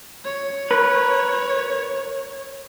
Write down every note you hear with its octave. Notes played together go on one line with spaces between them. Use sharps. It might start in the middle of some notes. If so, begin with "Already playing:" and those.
C#5
A#4 B4